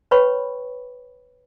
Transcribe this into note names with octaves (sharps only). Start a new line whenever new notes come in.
B4 C#5 G5 B5 C#6